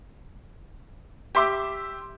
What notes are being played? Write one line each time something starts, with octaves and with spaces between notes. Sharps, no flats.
G4 E5 C6 D6 E6